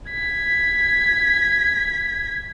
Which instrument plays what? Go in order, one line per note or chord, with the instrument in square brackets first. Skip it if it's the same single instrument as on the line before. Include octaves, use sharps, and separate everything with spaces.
[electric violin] G#6 B6